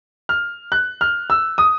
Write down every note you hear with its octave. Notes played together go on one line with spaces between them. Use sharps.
F6
F#6
F6
E6
D#6